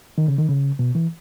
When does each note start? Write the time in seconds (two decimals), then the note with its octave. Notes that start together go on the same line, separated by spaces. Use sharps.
0.18 D#3
0.28 C#3
0.38 D#3
0.49 C#3
0.79 B2
0.95 E3